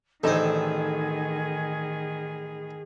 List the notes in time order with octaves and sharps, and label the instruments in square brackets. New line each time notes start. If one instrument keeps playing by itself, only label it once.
[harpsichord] A1 C4 [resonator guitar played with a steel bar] D3 D#4 A4 [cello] D#3 [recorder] G#4